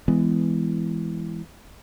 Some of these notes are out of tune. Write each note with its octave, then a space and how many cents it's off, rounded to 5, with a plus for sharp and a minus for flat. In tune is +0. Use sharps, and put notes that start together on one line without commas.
E3 +5 G#3 +0 B3 +20